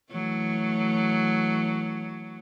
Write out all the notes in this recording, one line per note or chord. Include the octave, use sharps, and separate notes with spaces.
E3 F#3 A3